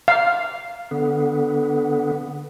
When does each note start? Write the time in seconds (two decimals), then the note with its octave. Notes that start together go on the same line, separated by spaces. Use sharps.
0.08 F5
0.91 D3 B3